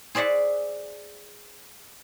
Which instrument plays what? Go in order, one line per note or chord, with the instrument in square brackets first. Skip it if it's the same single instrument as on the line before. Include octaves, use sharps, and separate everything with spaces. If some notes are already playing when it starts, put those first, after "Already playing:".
[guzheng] G#4 C5 D5 E5 F#5